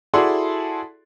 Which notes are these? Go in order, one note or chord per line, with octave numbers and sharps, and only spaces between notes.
E4 F#4 G#4 A4 D5 C6